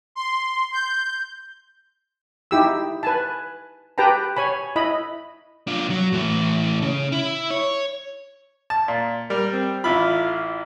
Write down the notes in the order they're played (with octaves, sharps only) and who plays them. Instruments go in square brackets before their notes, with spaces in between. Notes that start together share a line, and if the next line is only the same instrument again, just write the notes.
[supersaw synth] C6
G6
[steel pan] D#4 E4 G4 E6
B4 G#5 A5
G4 B4 G5 A5 A#5
C#5 G#5 B5
E4 D#5 B5
[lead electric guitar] D4 F4
F#3
A2 E3
C#3
E4
C#5
[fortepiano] A5
A#2
[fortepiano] G3 [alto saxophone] A#4
[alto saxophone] C4
[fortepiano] A1 E4 B5 [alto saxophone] F4